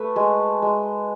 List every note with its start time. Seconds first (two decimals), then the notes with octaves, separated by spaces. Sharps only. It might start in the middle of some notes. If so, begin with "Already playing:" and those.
Already playing: A3 B4
0.16 G#3
0.62 G#3